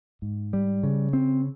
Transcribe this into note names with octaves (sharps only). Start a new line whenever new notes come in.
G#2
G3
C#3
C4